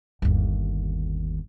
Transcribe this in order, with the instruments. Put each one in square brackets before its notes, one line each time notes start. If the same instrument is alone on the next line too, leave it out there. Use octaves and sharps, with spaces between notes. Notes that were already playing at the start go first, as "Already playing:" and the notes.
[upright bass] G1 D#2